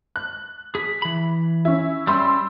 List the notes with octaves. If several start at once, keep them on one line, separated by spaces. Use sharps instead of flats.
F#6
G#4 B6
E3 B5
C#4 E4
G3 C#4 B5 C6 E6